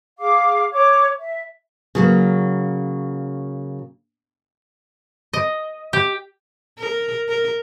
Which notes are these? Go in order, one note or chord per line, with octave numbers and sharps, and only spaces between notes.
G#4 F5 D6
C#5 D6
E5
C#3 F#3 A#3
D#5
G4
A#4
A#4